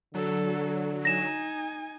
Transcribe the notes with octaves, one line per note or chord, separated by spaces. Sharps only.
D3 F#3 A4
D#4 G#5 A#6 E7